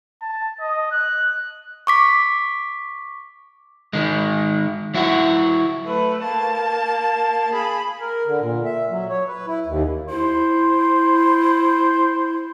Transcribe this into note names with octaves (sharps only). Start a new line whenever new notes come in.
A5
D#5
F#6
C#6 D6 B6
D#3 G#3
F#3 E4 F#4
A3 B4
A#3 A5
G#4 B5
A#4
D3
A#2
E5
F#3
C#5
B4
E4
D#2
E4 C5